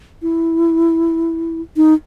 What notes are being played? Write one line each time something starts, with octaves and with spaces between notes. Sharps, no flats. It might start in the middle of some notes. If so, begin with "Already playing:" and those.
E4
D#4